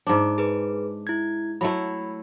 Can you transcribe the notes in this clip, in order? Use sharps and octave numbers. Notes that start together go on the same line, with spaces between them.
G#2 D4
G#4 B4
E4 G#6
F#3 A3 E4 B5